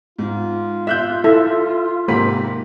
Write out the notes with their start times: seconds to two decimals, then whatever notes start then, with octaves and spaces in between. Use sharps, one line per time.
0.19 G#2 F4
0.87 E5 F5 E6 F#6 G6
1.24 E4 A4 E5
2.08 G#2 C3 A#3 C5 B5